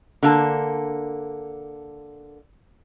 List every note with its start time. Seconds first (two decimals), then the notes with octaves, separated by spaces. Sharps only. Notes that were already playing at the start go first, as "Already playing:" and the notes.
0.23 D3 A#3 A5